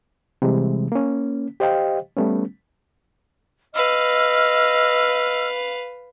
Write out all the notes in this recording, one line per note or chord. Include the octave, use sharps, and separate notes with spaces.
C3 E3 G3 G#3
A#3 C#4
G4 C5 D#5 F5 G5
G3 A3 B3 C#4
B4 D#5 F5 E6 F6